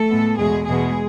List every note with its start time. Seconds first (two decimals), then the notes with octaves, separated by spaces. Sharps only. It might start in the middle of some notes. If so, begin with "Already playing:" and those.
Already playing: A3 A4
0.10 A2 G#3 B3
0.39 E2 B2 G#3 A3 G#4
0.67 E2 B2 G#3 B3 G#4